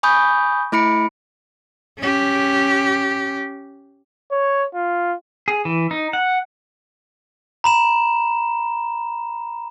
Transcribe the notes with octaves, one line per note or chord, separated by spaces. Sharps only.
G#5 B5 C#6 D#6 G6
A3 E4 B5 C#7 D7
C#4 G4
C#5
F4
G#4
E3
D#4
F#5
A#5 B5 E7